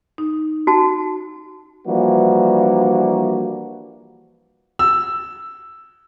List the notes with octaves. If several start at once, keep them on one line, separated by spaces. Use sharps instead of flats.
D#4
F#4 A5
E3 F3 G3 A#3 D4 F#4
E6